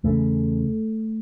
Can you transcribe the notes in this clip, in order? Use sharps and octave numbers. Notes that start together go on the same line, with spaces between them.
E2 C#3 A3